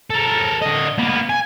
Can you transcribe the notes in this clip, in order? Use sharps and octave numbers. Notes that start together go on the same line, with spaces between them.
A4 A#4
D3 D#5
A#3 B3
G#5